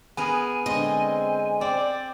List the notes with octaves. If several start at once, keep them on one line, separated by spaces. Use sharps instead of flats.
B3 G#4 A#4 G#5
D3 G#3 C4 D#5
C4 D5